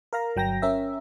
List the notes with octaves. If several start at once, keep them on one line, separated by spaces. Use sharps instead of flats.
A#4 F5 A#5
G1 F#3 G5 A#5 A#6
C#4 A#4 E5